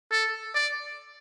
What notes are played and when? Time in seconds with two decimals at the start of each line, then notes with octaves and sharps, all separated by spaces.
0.11 A4
0.55 D5